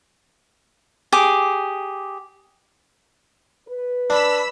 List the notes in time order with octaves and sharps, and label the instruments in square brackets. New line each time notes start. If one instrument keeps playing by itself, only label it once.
[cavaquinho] G4 G#4 D6
[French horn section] B4
[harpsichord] D4 [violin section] B5 E6 B6